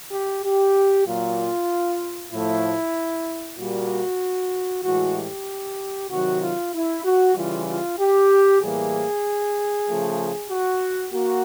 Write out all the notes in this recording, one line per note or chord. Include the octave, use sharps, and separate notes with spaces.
G4
G4
A#2 F#3 A#3 F4
A2 F3 A3 E4
A#2 G3 A#3 F#4
A2 E3 G#3 F#4
G4
C3 D#3 F#3 F#4
F4
E4
F#4
C#3 E3 G3 F4
F4
G4
A2 E3 G3 A#3 G#4
C#3 F3 A3
F#4
A#3 F#4